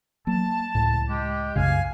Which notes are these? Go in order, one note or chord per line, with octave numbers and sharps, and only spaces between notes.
F#3 A#3 A5
C#2 A2
G#3 G4
C2 F#2 C#3 F5 G#5